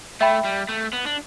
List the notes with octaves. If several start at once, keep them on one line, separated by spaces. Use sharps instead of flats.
A3 E5 G5 B5
G3
A3
B3
D4